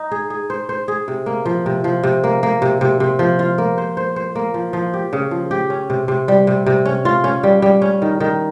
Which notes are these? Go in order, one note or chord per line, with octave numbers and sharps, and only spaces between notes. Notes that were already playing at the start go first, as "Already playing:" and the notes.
Already playing: D#4
G#4
G#4
C5
C5
G#4
C3
A#3
F3
C3
F3
C3
A#3
A#3
C3
C3
C3
F3
F4
A#3
C5
C5
C5
A#3
F3
F3
G4
C#3
F3
G4
C#4
C3
C3
G3
C3
C3
C#4
F4
C#4
G3
G3
C#4
D#3
D#3